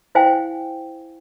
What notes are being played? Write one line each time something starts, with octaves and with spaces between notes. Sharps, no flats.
E4 C5 F5 G5 G#5